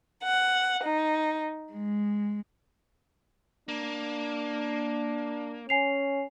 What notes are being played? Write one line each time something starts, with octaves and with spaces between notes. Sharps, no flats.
F#5
D#4
G#3
A#3 D4
C#4 G#5 C7 F7